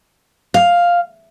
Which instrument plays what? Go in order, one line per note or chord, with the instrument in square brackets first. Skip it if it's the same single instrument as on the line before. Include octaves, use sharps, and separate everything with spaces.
[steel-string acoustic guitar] F5